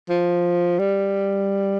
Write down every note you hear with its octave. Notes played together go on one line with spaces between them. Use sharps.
F3
G3